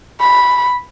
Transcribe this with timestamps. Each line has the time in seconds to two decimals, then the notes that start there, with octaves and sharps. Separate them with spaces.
0.20 B5